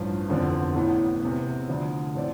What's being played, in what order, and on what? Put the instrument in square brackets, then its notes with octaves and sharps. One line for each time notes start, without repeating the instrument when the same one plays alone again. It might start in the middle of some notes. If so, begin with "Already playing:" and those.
Already playing: [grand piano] A1 G2 F3
F1 E2 D3 F3 C4
A1 A2 E3 B3
E2 C3 E3 B3
D2 D3 F3
A2 F3 C4 D5